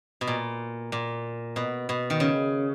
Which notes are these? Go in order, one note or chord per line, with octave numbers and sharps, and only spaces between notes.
B2
A#2
A#2
B2
B2
D#3
C#3